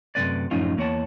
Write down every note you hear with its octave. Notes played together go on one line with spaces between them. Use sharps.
F#2 C3 A3 A#3 B4 D5
F#2 A2 F3 C#4 D#4 F4
E2 A#3 C#5 F#5 A5